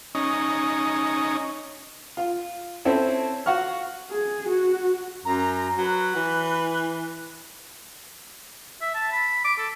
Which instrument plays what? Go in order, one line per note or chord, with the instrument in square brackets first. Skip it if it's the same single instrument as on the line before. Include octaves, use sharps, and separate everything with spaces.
[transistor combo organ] C#4 D#4
[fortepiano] F4
C4 C#4 E4 A4
F#4 F5 F#5 C#6 F6
[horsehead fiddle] G#4
F#4
[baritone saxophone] F#2 [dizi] A#5
[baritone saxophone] F#3 [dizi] B4
[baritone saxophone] E3
[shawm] E5
A5
B5
D6
A4